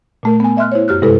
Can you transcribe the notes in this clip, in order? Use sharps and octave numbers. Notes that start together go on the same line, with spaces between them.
A#2 A3 A#4
B3 G#5
D#5 E5 C6 F6 F#6
E4 C5 C#5
F#2 G4 F6 F#6
G2 C3 G#3 E4 A4 B4